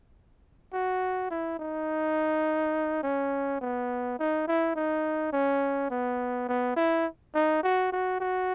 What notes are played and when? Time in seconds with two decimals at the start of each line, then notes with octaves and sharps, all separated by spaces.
0.73 F#4
1.31 E4
1.59 D#4
3.03 C#4
3.61 B3
4.19 D#4
4.47 E4
4.76 D#4
5.33 C#4
5.90 B3
6.49 B3
6.76 E4
7.35 D#4
7.63 F#4
7.92 F#4
8.20 F#4